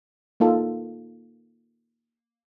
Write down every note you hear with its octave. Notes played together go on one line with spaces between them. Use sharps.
A#3 D#4 F4 A4